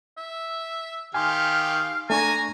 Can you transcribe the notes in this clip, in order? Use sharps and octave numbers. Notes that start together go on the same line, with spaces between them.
E5
D#3 G4 F5 G#5 C6
A3 D4 G#5 A#5 C#6